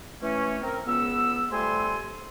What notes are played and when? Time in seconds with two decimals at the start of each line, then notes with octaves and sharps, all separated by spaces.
0.22 E3 A3 C#4
0.62 C4 A#4
0.87 C#2 B3 E6
1.51 F3 G3 A3 A4 G#5 C6